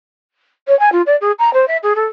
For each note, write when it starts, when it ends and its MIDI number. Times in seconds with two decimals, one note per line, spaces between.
0.68 0.78 73
0.80 0.92 80
0.92 1.02 65
1.06 1.16 74
1.21 1.32 68
1.39 1.53 82
1.54 1.68 72
1.68 1.78 76
1.83 1.93 68
1.96 2.05 69